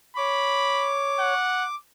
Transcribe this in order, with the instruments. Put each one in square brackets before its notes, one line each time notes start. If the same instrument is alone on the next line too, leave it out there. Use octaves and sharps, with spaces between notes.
[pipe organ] C#5 [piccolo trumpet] B5 [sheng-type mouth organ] D6
[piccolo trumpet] F#5